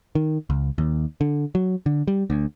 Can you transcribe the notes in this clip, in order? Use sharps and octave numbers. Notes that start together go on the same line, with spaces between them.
D#3
C#2
D#2
D3
F#3
D3
G3
D2